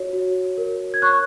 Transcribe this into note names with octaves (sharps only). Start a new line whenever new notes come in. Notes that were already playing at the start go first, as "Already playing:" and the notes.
Already playing: F#4 C#5
F#4
A#4
G#6
C#5 C#6 F#6